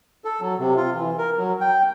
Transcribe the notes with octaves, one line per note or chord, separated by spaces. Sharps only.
A4
F#3
C3
F4
E3
A#4
F#3
G5